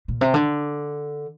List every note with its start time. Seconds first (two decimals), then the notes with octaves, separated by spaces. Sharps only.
0.08 A#2
0.21 C3
0.34 D3